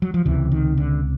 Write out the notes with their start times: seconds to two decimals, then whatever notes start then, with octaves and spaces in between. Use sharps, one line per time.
0.02 F#3
0.14 F3
0.25 C#2 C3 E3
0.52 D#3
0.78 D3